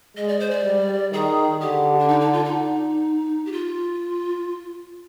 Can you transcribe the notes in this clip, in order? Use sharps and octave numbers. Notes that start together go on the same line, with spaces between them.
G#3 D#5
D5
C5
D5
G3
D#3 G#4
D3 G4
D4
D#4
D#4
F4
D#4
G4
F4